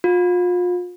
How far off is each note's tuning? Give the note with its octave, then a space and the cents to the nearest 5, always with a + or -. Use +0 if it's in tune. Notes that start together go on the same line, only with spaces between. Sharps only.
F4 +35